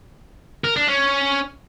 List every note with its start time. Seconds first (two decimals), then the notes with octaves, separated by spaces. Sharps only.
0.64 A#4
0.76 D4
0.88 C#4